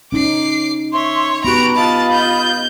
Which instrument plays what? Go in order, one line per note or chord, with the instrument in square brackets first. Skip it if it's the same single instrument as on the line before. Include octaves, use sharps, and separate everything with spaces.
[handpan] C#4 D#4 [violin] D6 C7
[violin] C#5 [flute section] E5 C6 C#6
[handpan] B3 G4 [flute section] F#4 B5 [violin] A#5 D7
[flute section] F4 D#5 B5 [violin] A5
[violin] G6